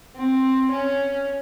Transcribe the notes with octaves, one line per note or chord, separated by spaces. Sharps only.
C4
C#4